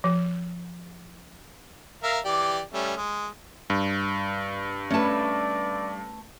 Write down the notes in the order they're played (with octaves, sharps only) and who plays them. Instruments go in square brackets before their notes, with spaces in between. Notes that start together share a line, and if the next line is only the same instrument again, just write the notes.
[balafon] F3
[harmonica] A#4 E5 F5
E3 G4 D5
G3 A3 C#4
G#3
[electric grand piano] G2
[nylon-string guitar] A3 A5 [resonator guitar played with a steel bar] C#4 B4 [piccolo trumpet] D5